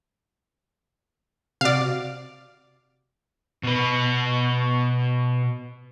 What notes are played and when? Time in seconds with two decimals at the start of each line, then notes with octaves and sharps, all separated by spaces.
1.61 C3 F#4 D5 F5
3.63 B2 B4